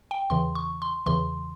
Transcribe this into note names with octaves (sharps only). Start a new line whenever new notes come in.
G5
E2 C#3 E3 C6
C#6
C6
E2 C#3 E3 C6